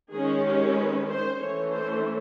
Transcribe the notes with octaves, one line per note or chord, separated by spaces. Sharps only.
D#3 G#3 C#4 G#4
G4
B4
C5
E3 A3 C#4 C#5
C5